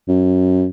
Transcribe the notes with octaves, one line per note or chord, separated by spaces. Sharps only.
F#2